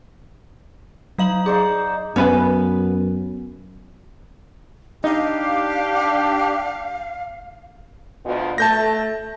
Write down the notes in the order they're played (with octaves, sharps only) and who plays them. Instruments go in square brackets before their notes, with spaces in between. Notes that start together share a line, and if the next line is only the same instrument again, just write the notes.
[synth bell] F#3 F5 F#7 [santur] D#4
[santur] D#4 C5 D5 [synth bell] G#4
[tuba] F#2 [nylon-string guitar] B3 [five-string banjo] C#4 B4 B5
[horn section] D4 G4 [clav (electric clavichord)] D#4 [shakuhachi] F5
[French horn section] D2 B2 F4
[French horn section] A3 [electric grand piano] A5 G6 A#6